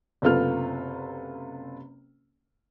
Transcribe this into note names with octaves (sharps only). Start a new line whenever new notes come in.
F#1 C3 B3 F4 A4 F6